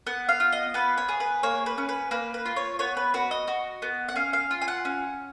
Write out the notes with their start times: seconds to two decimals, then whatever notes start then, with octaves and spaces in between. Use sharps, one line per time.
0.07 B3 F#5
0.29 F5
0.40 F4
0.52 D#5
0.74 B3 B4
0.98 C#5
1.09 G#4
1.20 B4
1.43 A#3 C#5
1.66 B4
1.78 C#4
1.89 B4
2.11 A#3 B4
2.34 B4
2.46 F4
2.56 C#5
2.79 B3 C#5
2.97 B4
3.14 F#4 B4
3.31 D#5
3.47 F#4
3.82 B3
4.08 F#5
4.16 C#4 F5
4.33 F5
4.51 F4
4.62 G#5
4.68 F#5
4.85 C#4